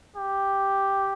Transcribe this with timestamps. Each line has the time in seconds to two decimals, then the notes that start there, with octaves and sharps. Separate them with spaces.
0.16 G4